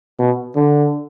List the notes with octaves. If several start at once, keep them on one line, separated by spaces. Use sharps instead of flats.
B2
D3